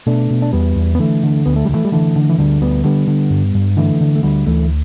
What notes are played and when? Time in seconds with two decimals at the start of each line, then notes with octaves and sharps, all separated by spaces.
0.07 B2 A3 D4
0.30 B2
0.42 D4
0.53 E2 G3 B3
0.76 E2
0.95 B3
0.99 D3 E3 A3
1.23 D3
1.46 D2 B3
1.56 A3
1.65 G3
1.70 D2
1.74 E3 A3
1.85 G3
1.92 D3 E3 A3
2.16 D3
2.29 E3
2.38 D2 D3 G3
2.61 D2 G3 B3
2.84 D3 G3 B3
3.08 D3
3.31 G2
3.55 G2
3.77 D3 E3 A3
4.01 D3
4.15 A3
4.23 D2 D3 G3
4.46 D2 E3 A3